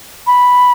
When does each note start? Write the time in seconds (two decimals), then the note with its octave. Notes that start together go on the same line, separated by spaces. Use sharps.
0.26 B5